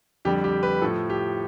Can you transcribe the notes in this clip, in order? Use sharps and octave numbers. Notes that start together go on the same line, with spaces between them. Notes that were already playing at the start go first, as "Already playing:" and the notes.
F2 D3 G3 G4
G4
B4
A2 F3 A4
G4